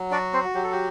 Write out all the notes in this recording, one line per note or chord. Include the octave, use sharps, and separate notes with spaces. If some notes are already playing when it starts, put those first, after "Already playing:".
Already playing: F#3
D4 F#4 D5
C4 C5
F#3 G4
A4
G4